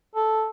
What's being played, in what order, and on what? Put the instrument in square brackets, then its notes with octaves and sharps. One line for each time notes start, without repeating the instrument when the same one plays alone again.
[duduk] A4